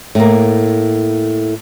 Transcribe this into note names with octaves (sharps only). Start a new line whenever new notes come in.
A2 A#3